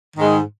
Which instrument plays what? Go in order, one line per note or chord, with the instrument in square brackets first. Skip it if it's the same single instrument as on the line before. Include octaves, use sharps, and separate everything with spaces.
[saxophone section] G#2 D#3 G#3